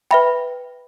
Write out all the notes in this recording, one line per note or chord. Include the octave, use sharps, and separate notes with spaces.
B4 E5 G5 B5